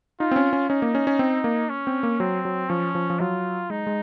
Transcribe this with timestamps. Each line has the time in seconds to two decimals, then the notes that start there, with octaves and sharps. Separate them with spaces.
0.20 D#4 F4
0.31 C4
0.36 C#4
0.53 C#4
0.69 C#4 D#4
0.82 A#3
0.95 C#4
1.07 C#4
1.19 C4
1.44 A#3
1.69 C#4
1.87 C4
2.03 A#3
2.20 F#3 C4
2.45 F#3
2.69 F3 C#4
2.95 F3
3.10 F3
3.19 F#3 F4
3.70 G#3 D#4
3.87 G#3